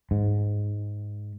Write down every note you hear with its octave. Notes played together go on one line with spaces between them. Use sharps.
G#2